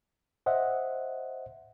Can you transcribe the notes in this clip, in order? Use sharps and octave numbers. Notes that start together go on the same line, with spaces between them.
C5 D#5 E5 F#5